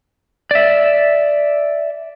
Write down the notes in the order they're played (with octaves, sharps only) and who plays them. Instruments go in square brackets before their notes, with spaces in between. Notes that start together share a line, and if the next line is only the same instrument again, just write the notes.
[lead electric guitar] D5 E5